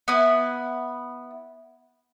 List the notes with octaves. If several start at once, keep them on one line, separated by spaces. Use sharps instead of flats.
B3 E4